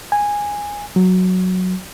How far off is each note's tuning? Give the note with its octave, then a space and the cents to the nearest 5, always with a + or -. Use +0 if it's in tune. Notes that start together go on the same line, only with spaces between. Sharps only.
G#5 -10
F#3 -5